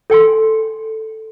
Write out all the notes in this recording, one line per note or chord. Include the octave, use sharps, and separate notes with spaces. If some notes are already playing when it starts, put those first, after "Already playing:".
A4 G5 G#5 C6